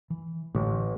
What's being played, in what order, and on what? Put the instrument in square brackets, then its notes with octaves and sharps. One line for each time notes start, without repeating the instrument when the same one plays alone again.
[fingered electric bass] E3
[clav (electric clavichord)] A1 [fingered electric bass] A2 D3